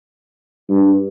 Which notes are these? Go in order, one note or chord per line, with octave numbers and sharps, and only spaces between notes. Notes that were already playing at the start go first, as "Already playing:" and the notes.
G2